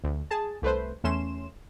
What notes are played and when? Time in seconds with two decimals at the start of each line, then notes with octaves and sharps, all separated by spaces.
0.04 D2
0.31 G#4 A5
0.62 C2 A3 B4 C5
1.04 E2 A3 C#4 C6 E7